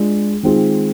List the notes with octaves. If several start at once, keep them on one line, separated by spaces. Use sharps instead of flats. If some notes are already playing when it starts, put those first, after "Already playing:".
Already playing: G#3 D4 F4 G#4
D#3 G#3 C4 F4 G#4